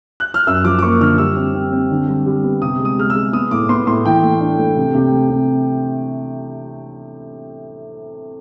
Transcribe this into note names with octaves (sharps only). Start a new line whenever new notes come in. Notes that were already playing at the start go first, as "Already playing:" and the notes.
F#6
F6
F#2 E6
F3 D6
D6
A#3 C#6
D3 F6
G3 E6
C4
C4
C4
D3
G3
G3
B3
C3 D#6
G#3
D#6
G#3 F6
E6
G#3
B3 D#6
A2 D6
B3 C6
A2 C6
E3 G5
A3
D4
A3
C3
C3
A3
C3